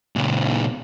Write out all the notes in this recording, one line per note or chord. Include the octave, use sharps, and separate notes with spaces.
C#2 A#2